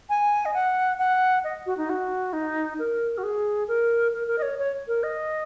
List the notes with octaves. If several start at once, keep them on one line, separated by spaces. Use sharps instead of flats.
G#5
D#5
F#5
F#5
D#5
F#4
D#4
F#4
D#4
A#4
F#4
G#4
A#4
A#4
A#4
D#5
C#5
C#5
A#4
D#5